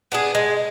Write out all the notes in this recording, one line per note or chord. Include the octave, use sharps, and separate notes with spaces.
B3 D4 G#4
G#3